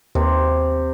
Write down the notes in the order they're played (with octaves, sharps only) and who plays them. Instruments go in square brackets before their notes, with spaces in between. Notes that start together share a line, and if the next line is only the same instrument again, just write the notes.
[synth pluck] D#2 [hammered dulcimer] C3